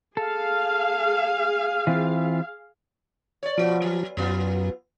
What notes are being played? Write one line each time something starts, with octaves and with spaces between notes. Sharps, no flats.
G#4 A4 F5
E3 C4 F4
C#5 D5
B2 F3 F#4
F#3
F#2 F#3 B3 F4